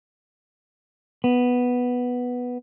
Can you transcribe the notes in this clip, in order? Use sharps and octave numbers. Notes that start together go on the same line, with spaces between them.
B3